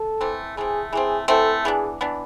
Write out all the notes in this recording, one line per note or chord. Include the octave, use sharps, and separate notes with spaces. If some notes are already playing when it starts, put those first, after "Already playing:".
Already playing: A4
E3 A3 C4
E3 A3 C4 G#4
E3 A3 C4 G#4
E3 A3 C4 A4
E3 B3 D4 G#4
E3 B3 D4